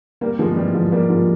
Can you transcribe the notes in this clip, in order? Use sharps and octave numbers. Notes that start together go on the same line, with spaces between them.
G3 A#3
F3 G#3
E3 G3
F3 G#3
G3 A#3
F3 G#3